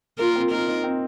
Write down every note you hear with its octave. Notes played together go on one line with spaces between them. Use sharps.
A#3 F4 A#4
C4
D#4 F4 A#4
D#4
C4